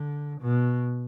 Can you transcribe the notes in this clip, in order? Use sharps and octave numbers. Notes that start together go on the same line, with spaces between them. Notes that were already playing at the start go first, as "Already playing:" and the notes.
Already playing: D3
B2